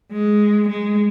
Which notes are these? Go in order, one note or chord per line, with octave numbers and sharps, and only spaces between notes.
G#3
G#3